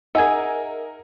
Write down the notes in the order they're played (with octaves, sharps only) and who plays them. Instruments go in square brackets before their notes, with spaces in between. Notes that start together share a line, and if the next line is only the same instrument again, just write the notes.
[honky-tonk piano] D#4 A#4 [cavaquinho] G#4 E5 [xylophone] F#5 G#5 G#6